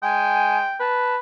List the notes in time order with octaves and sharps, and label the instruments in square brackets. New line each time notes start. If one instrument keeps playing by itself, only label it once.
[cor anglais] G#3 [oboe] G5 [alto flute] G#5
[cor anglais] B4 [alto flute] A5